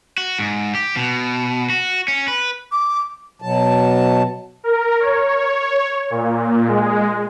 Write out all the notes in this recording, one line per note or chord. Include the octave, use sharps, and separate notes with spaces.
F#4
G#2
G4
B2
F#4
C#4
B4
D6
B2 F#3 A5
A#4
C#5
A#2
G#3